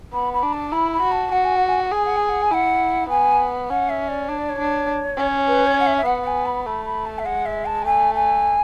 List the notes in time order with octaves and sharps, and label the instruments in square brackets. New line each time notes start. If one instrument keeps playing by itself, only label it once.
[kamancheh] B3 [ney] B5
[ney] B5
[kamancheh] D4
[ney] A5
[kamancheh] E4 [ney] B5
[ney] B5
[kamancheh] F#4
[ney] A5
[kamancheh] F#4 [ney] F#5
[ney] G#5
F#5
G#5
F#5
[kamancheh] G#4 [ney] G#5
[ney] F#5
G#5
F#5
G#5
[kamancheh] E4 [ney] F#5
[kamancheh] B3 [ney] G#5
[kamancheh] C#4 [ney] F#5
[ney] E5
D5
[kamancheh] D4 [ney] C#5
[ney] D5
C#5
[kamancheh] D4
C#4
[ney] B4
C#5
F#5
E5
E5
[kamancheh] B3 [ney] F#5
[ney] F#5
G#5
B5
[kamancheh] A3 [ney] B5
[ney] B5
A5
E5
[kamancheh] G#3 [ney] F#5
[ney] E5
A5
[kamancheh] A3 [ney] G#5
[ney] G#5